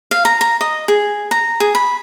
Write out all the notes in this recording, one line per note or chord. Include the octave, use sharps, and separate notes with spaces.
F5
A#5
A#5
D#5
G#4
A#5
G#4
B5